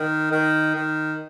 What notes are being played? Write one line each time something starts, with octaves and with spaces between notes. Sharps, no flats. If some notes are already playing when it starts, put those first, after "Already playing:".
Already playing: D#3
D#3
D#3